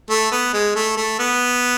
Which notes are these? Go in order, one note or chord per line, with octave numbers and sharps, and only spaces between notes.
A3
B3
G#3
A3
A3
B3